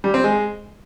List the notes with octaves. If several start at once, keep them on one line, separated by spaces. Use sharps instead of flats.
G3
C4
G#3